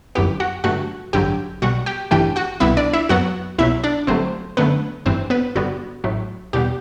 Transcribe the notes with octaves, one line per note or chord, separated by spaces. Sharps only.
G1 F#2 E3 B3 G4
F#4 F#5
G1 G2 F#3 A3 F#4 F#5
A1 G2 D3 F#3 G4 G5
B1 B2 G3 F#4 F#5
G4 G5
A1 G2 E3 A3 G4 G5
F#4 F#5
C2 B2 G3 B3 E4 E5
D4 D5
E4 E5
F#2 F#3 B3 F#4 F#5
C2 B2 F#3 E4 E5
D4 D5
G1 G2 F#3 A3 C4 C5
F#2 D3 A3 B3 B4
G1 G2 E3 C4 C5
B3 B4
G1 G2 D3 G3 B3 F#4
A1 A2 F#3 A3
E2 B2 G3 B3 G4